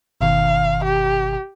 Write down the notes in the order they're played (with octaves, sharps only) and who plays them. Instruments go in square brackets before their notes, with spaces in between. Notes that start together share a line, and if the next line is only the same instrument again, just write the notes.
[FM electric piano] G1 B2 D#3 [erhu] F5
[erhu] G4